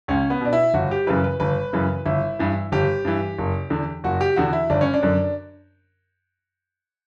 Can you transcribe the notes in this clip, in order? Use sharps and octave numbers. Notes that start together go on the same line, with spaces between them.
C#2 C#4
B3
B2 D4
E4
G1 F#4
G4
F#2 C#3 E3 B4
B4
G1 B4
F#2 C#3 E3
G1 E4
G2 E3
G1 G4
G2 E3
F#1
E2 D3
F#1 F#4
G4
E2 D3 F#4
E4
G1 D4
C#4
D4
F#2 D3